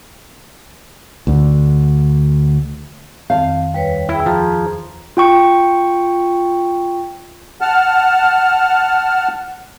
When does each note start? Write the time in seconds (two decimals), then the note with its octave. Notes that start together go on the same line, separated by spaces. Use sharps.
1.27 D2 D3
3.30 F2 D#3 C4 F5
3.74 D#2 G3 B4 C#5
4.09 E4 G#4 G5 B5
4.26 F3 G#4 A#5
5.17 F4 G5 C#6
7.61 F#5 A5 F6